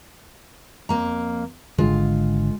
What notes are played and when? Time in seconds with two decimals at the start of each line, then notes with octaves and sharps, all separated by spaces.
0.89 F2 A#3 A#5
1.78 G#1 D3 G#3 F4